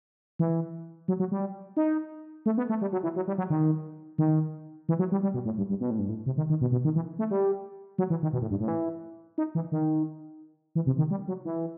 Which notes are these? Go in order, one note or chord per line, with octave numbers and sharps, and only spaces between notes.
E3
F#3
F#3
G3
D#4
A3
B3
A3
G3
F#3
E3
F#3
G3
F#3
D#3
D#3
E3
F#3
G3
G3
B2
A2
G2
G2
B2
A2
G2
A2
C3
D#3
D#3
B2
B2
D#3
E3
A3
G3
F#3
E3
D#3
B2
A2
G2
A2
E3
D#4
E3
D#3
E3
C3
D#3
G3
F#3
E3